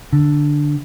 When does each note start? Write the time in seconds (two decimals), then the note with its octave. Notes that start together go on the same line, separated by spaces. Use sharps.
0.13 D3